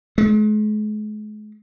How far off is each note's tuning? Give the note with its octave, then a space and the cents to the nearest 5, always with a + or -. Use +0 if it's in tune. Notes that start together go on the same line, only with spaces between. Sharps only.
G#3 +40